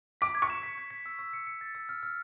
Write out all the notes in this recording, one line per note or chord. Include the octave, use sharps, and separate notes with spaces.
D6 B6
G#6
C#6
E7
B6
G#6
B6
E6
E6
C#7
C#7
A6
E6
F6
F6